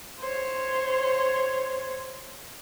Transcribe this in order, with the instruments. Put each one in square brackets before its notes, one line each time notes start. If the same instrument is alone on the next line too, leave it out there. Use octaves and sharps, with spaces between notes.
[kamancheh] C5 C#5